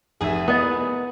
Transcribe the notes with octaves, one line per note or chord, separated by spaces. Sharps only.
F1 D#4 G#4 E5
B3 E4 D#5 D#6